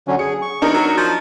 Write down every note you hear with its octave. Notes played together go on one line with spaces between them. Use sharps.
D3 F#3 C#4
G#4 C#7
C#6
E2 D4 D#4 A#4
F#3
F3